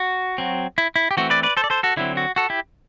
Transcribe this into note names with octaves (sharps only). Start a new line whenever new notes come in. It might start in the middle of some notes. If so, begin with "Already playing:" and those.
Already playing: F#4
F#3 C4
E4
E4
G4
E3 A3 C4 F#4
B4 D5
B4 D5
A4 C5
D5
A4 C5
F#4 A4
D3 F#3 C4 E4
F#4
F#4 A4
E4 G4